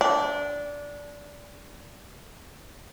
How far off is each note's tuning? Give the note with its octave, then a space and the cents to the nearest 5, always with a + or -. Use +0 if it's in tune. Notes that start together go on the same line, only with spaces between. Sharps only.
D4 -15